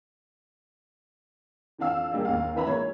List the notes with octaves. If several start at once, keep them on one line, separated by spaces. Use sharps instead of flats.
F2 E3 D4 F5 E6
G3 A#3 D4 D#4 G#4
D#2 F5
E3 D4 B4 E5 A#5 B5
F3 G#3 A#3 C#5